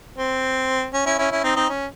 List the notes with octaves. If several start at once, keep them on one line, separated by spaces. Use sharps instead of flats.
C4
C#4
C#4 E4
C#4 E4
C#4 E4
C4 D#4
C4 D#4
C#4